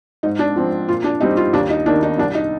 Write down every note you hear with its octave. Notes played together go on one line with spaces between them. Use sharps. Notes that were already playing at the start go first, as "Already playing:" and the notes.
G#2 D#4
D4
F3 C4
A#2 F4
D4
G3 C4 D#4
F4
D#2 D4
D#4
D#3 A#3 D4
D#4
C2 D4
D#4